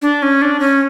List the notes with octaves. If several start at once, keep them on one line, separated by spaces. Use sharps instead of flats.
D4
C#4
D4
C#4